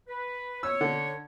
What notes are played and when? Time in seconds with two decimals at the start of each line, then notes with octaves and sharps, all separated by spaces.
0.08 B4
0.63 C#5 E6
0.81 D3